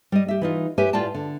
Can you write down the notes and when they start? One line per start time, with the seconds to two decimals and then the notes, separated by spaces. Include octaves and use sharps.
0.12 G3 D#5
0.28 G4 E5
0.41 E3 D#4 F4
0.78 G4 A#4 B4 C#5 E5 G#5
0.93 A2 F4 D5 G5 A5
1.14 D3